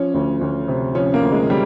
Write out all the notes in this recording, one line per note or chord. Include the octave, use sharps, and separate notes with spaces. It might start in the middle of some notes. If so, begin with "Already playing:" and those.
Already playing: F3 C#4
D2
D2
C3
F3 C#4
A#3
D2
G#3
G3